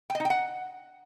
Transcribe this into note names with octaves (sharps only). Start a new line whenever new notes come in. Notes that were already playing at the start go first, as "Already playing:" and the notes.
G5
D#5
D#4
G5
F#5